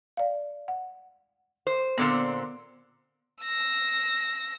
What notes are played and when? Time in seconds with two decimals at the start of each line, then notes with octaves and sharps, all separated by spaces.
0.17 D5 F5
0.68 F#5
1.67 C5
1.98 A#2 D3 B3 C4
3.42 E6 A#6